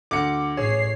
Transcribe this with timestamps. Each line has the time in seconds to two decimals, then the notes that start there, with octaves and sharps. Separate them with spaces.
0.11 D2 D6 C#7
0.57 A1 G#4 C#5 C7